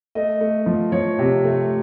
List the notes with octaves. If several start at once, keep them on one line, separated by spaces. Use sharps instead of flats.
A3 D#5
A3
F3
F3 C#5
C3
A3